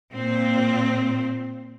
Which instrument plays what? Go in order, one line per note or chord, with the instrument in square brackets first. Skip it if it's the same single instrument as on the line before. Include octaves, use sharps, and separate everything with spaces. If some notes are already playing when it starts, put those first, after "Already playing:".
[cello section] A#2 C4